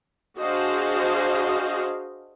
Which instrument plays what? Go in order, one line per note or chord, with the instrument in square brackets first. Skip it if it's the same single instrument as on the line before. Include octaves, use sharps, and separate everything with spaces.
[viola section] D4 F#4 G#4 C5 D#5 F5